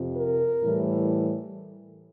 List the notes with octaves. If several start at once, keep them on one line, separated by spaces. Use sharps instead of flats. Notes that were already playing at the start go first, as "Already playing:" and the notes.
Already playing: F2 C3 F3
A#4
A2 E3 G3